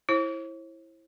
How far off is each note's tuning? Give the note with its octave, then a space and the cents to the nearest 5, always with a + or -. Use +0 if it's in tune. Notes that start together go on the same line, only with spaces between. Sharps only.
E4 +0 C5 +45